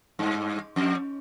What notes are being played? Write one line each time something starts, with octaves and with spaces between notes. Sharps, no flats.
G2
F2